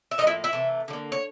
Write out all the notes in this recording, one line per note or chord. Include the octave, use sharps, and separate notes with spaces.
E5
A2 F3 A#3 D#4 D#5
E4 E5
E4 E5
C3 E3 A3
D3 G3
A#3
C#5